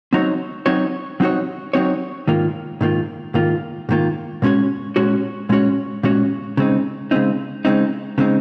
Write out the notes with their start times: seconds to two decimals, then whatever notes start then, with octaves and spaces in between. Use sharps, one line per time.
0.13 F#3 C4 D#4 F#4 C#5
0.66 F#3 C4 D#4 F#4 C#5
1.20 F#3 C4 D#4 F#4 C#5
1.73 F#3 C4 D#4 F#4 C#5
2.28 G#2 D#3 A#3 F4
2.81 G#2 D#3 A#3 F4
3.34 G#2 D#3 A#3 F4
3.89 G#2 D#3 A#3 F4
4.42 A#2 G#3 C#4 F#4 C#5
4.96 A#2 G#3 C#4 F#4 C#5
5.49 A#2 G#3 C#4 F#4 C#5
6.03 A#2 G#3 C#4 F#4 C#5
6.57 C#3 G#3 C4 D#4
7.11 C#3 G#3 C4 D#4
7.65 C#3 G#3 C4 D#4
8.18 C#3 G#3 C4 D#4